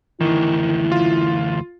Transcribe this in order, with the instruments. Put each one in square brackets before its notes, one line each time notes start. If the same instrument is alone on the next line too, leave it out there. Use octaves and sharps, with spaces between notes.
[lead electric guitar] D2 E3 [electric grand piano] D#3 [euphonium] E4
[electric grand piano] F4